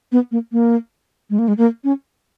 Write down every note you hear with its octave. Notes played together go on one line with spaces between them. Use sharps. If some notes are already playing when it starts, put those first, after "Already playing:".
B3
A#3
A#3
G#3
A#3
G#3
A#3
C#4